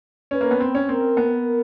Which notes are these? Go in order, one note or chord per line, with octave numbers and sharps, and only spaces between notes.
C#4 B4
A#3
B3
C4
C#4
C4 A#4
B3